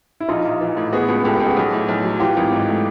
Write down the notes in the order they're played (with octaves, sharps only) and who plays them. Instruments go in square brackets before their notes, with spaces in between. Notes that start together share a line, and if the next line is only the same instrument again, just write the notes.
[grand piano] E4
[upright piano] A#1 [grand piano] D#4 F4
[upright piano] A#1
E3
A2
[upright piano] B3 [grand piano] F#4 G#4
[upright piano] C#2
[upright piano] C#2 [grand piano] G4 A4
[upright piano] C#2 [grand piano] G4 A4
[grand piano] F#4 G#4
[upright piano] B1
A2
B1
F#3
[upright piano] E3 [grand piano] F4 G4
[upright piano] G#1
G#2
A3